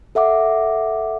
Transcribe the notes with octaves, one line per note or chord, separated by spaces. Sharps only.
A4 E5 F#5 D6